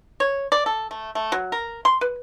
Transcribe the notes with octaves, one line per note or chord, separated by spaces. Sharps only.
C#5
D5
A4
A3
A3
F#3
A#4
C6
B4